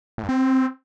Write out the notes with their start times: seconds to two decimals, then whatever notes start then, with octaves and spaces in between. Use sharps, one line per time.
0.18 A2
0.23 G2
0.29 C4